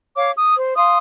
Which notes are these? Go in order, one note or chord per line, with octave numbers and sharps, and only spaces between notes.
C#5 F5 D6
D#6
C5
F5 C6 D#6